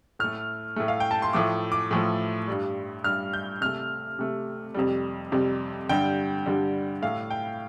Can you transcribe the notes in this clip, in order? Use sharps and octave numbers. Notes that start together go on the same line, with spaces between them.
A2 A3 F6
A2 A3
F5
G5
A5
C6
A2 F3 A3 D6
D6
A2 F3 A3
G2 G3
G2 G3 F6
G6
C3 A3 F6
C3 A3
F2 C3 G3
F2 C3 G3
G2 D3 G3 G5
G2 D3 G3
A2 A3 F5
G5